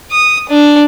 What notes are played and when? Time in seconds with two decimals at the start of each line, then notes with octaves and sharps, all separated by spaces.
0.12 D#6
0.49 D4